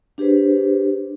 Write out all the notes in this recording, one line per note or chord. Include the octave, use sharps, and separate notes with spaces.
D4 G4 G#4 B4 C5